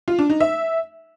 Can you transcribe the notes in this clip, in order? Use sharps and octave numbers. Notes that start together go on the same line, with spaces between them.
F4
D4
D#4
E5